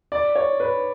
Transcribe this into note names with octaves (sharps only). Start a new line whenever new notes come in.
D5
C#5
B4